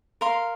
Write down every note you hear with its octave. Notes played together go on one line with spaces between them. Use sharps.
A#4 F5 C6